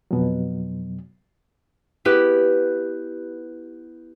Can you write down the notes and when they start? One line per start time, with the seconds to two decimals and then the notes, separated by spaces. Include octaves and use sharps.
0.11 F2 B2 F#3
2.05 B3 E4 G4 B4